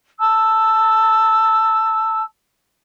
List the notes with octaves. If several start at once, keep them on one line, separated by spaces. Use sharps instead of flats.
A5 E6